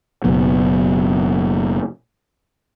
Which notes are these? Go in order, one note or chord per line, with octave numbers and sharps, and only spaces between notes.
F#1 B2 F#3 B3